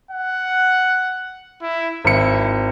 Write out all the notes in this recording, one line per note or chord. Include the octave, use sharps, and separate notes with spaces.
F#5
E4
G#1 E4 C#7